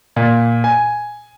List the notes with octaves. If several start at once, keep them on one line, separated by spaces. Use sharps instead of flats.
A#2
G#5